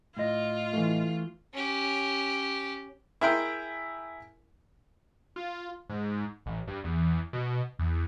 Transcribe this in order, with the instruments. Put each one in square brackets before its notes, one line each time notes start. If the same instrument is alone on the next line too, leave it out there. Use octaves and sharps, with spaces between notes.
[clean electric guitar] A2 D#5 [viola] F4
[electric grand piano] E3 A3
[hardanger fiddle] C#4 G4
[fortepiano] E4 G#4 A#4 E5 G5 C6
[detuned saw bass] F4
G#2
A1
G2
E2
B2
E2